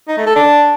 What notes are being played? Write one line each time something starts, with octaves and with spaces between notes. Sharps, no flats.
D#4
A3
A4
D4